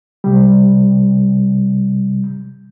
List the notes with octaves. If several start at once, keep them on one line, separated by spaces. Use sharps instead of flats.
C3 G3